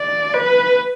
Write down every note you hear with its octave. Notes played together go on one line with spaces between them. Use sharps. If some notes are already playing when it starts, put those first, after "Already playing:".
Already playing: D5
B4